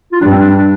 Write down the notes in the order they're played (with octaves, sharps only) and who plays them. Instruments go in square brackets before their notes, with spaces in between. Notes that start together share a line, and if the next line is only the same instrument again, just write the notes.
[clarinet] F4
[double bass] G2 [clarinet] D4
[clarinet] C4
D4
D4